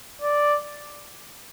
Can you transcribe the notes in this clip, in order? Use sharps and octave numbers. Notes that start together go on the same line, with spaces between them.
D5